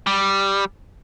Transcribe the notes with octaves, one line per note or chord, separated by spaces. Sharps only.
G3